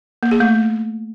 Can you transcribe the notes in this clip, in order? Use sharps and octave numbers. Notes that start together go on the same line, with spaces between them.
A#3
G#4
A3